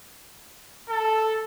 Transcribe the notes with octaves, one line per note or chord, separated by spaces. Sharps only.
A4